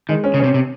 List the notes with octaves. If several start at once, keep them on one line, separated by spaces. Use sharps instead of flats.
D#3 G#3
C#4
C#3
C3 C#4
C3